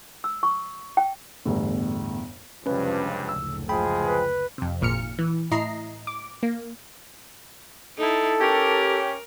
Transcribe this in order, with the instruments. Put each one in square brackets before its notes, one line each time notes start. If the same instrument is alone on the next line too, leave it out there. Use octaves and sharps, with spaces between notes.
[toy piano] E6
C#6
G5
[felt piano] G1 E2 A2
[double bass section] F1 F3 [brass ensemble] C#2 G2 [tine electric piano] C#4 B4
[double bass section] F#1 D2 A2 [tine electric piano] E6
[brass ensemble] F3 G#3 G#4 [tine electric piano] G5 B5
[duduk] B4
[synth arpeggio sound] F2 C3
G#1 A#2 F6 C#7
E3
A2 E4 D#5 A#5 C7
D6
A#3
[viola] D#4 E4 [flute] A4
[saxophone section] C#4 G4 [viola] A#4